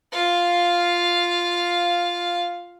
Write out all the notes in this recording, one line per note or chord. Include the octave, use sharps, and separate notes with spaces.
F4 F5